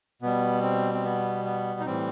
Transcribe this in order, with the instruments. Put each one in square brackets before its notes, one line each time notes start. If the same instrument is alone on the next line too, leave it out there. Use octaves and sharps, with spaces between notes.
[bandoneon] B2 G3 B3
C4
C4
B3
B3
D#4
A2 E3 G3 C4